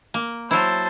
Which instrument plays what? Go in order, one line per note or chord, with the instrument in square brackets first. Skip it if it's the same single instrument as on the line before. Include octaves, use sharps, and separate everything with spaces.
[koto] A#3
[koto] F#3 E4 [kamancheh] C5 A5